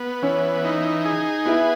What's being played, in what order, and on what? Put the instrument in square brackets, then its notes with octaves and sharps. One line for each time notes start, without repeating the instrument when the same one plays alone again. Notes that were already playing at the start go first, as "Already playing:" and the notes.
Already playing: [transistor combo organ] B3
[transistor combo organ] E3 [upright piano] C#4
[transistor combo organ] D#4
G#4
[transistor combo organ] B3 [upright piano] E4